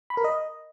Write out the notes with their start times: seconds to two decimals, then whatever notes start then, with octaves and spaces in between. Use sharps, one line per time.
0.10 B5
0.17 A#4
0.24 D#5